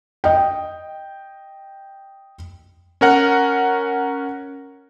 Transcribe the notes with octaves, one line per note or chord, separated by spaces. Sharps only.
D#5 G5
C#4 A#4 F#5